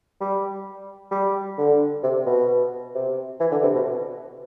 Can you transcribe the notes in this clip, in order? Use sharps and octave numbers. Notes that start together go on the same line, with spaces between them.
G3
G3
D3
C3
B2
C3
E3
D3
C3
B2